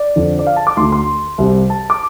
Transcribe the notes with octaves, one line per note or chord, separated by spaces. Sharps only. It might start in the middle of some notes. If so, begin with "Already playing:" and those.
Already playing: D5
F2 D3
D5
F5
A5
D6
D2 D3 C6
C6
C2 C3
A5
D6